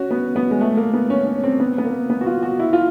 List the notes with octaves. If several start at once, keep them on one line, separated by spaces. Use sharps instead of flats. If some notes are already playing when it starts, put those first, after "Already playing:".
Already playing: C#4 F#4
B3
B3
G#3
A3
A#3
B3
C#4
C#4
C4
B3
B3
A#3
B3
F#4
F4
F#4
E4
F4